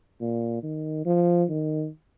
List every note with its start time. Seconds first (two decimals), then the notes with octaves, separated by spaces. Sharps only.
0.21 A#2
0.63 D#3
1.06 F3
1.49 D#3